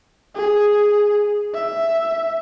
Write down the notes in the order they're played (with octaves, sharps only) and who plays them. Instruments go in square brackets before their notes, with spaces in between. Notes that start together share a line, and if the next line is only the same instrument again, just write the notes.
[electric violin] G#4
E5